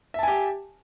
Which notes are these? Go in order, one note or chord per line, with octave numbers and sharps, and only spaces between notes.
G4 E5 G#5 A5